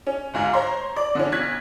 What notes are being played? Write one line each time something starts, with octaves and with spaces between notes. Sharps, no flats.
C#4
D2 G#2 F5 G#5
C5 C#5 A#5 C6
D5
D3 E3 C#4
B1 F#6 G#6 B6